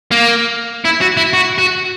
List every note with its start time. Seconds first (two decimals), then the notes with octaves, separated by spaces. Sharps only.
0.12 A#3
0.85 E4
1.01 F#4
1.17 E4
1.33 F#4
1.58 F#4